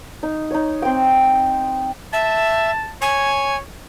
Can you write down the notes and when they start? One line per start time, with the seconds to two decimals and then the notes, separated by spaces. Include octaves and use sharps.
0.23 D#4
0.51 D#4 C#5
0.82 C4 G5
2.13 E5 A5
3.02 C#5 G#5